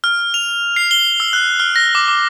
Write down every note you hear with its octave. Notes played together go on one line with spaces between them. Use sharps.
F6
F7
C7
G7
E6
F#6
F6
A#6
D6
D6